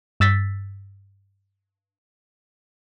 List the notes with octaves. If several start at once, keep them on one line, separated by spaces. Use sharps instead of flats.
G2 E6 A6 B6